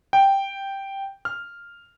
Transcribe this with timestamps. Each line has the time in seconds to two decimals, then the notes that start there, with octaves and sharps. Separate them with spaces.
0.13 G5
1.25 F6